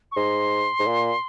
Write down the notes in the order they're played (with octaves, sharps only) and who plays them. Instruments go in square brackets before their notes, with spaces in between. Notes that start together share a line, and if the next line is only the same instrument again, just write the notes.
[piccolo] C#6
[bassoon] G#2 [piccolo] C6
[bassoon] G#2
A#2